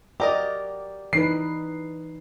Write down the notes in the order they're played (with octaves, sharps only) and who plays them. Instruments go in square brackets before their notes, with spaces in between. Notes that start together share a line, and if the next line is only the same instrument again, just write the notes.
[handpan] F#4 D5 [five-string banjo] G4 A#4 D#5
[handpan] E3 D#4 B4 [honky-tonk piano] C7